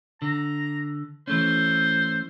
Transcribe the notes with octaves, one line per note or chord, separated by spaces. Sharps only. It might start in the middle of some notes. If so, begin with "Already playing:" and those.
D3 A#5
E3 A3 C#4 C5